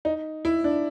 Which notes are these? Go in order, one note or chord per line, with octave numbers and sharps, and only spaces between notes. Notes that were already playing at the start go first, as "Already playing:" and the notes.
D#4
E4
D4